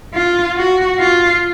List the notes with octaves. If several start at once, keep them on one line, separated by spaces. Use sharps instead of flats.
F4
F#4
F4